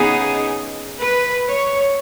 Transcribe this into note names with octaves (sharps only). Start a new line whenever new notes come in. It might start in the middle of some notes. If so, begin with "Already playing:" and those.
Already playing: C#3 B3 D#4 G#4
B4
C#5